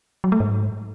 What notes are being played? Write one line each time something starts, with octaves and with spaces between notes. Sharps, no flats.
F#3
A3
G#2